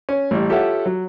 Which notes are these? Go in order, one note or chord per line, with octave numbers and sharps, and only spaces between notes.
C#4
A1 G3
F4 G4 A4 C#5 E5 F#5
F#3